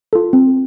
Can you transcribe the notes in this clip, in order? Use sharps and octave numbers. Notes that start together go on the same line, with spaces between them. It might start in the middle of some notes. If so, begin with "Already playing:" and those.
F4 A4
C4